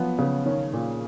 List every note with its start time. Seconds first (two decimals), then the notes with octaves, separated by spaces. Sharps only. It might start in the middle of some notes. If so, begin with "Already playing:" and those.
Already playing: F3 F#3 B3
0.18 C#3 B3
0.46 D#3 C#4
0.73 A#2